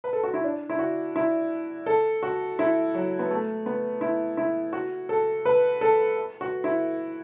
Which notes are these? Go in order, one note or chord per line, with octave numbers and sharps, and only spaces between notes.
B4
A4
F#4
E4
D4
E4
F#4
E4
A4
F#4
E4
F#3
B3
A3
B3
E4
E4
F#4
A4
B4
A4
F#4
E4